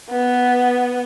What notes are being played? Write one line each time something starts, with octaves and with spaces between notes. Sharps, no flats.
B3